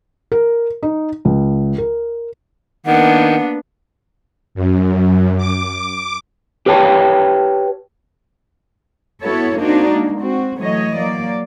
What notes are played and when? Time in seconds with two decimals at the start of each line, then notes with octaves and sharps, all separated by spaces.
0.32 A#4
0.83 D#4
1.25 C#2
1.78 A#4
2.86 D#3 A#3 B3 D4 F#5
4.55 F#2
5.37 D6
6.66 G4 B4 C#5 G5 A5
9.23 B3 E4 F#4 A4 C#5
9.57 A#3 C4 D4 D#4 F#4
9.90 G#3 A#3
10.21 C4 F#4
10.59 E3 F#3 A3 C#5 D#5
10.97 F#3 A#3 D5